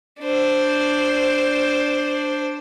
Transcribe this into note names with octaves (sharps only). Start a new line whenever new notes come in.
D4 C5